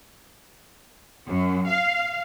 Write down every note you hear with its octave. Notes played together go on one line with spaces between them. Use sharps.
F#2
F5